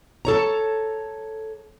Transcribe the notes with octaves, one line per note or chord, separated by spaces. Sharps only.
A4 C#5 A#5